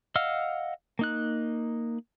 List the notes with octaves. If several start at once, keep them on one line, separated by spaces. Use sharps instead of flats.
D#5 F5 F#5 E6 F6
A#3 D#4 F#6